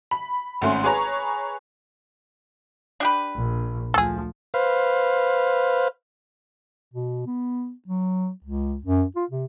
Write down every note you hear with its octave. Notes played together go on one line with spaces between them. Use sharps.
B5
G#1 A3 C#4 C6
G#4 B4 C#5 A#5
D4 G4 B4
A#1
D2 F3 G#4 A4
B4 C5 F5
B2
B3
F#3
C#2
F#2
F4
C3